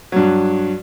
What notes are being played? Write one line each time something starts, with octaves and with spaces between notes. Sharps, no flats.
G2 F#3